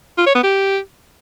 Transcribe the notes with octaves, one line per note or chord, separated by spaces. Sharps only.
F4
C#5
B3
G4